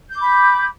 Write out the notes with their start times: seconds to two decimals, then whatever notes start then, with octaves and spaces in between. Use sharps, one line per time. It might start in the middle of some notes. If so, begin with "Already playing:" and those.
0.10 G6
0.15 D6
0.20 B5